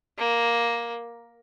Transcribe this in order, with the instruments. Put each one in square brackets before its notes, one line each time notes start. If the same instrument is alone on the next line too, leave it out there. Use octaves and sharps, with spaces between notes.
[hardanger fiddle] A#3